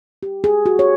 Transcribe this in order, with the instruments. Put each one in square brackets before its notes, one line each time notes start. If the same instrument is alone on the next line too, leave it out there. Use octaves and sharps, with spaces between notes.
[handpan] G4
G#4
F#4
C#5